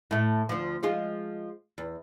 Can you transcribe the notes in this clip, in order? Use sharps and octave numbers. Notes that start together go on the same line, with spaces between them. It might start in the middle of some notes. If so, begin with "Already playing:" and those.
A2 A3
D2 F3
F3 G#3 F4
E2